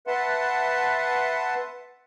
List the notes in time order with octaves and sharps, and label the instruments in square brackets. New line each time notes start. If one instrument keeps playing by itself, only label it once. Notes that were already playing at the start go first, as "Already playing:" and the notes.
[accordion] B4 E5 F#5 A5 C6